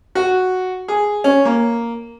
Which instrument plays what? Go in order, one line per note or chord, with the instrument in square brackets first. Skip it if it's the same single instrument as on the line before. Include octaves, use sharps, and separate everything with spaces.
[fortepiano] F#4
G#4
C#4
A#3